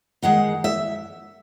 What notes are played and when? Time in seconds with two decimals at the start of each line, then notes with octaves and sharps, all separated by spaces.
0.22 D#3 G#3 D#4 F#5
0.64 E5